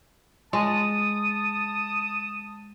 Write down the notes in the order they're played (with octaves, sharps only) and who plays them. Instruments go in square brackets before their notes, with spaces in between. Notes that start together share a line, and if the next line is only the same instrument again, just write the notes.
[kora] G#3 [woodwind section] A5 D#6